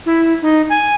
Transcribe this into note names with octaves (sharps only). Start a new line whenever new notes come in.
E4
D#4
G#5